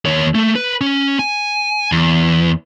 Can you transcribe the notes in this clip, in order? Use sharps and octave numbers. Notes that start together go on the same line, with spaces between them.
D#2 C#5
A3
B4
C#4
G#5
E2